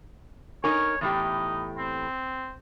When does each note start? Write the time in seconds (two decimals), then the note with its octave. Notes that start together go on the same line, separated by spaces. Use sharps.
0.64 D#4 A#4 C#5 G#5 C#6
1.01 E2 A2 D#4 G4
1.78 C4